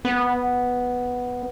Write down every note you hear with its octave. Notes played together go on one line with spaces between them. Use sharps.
B3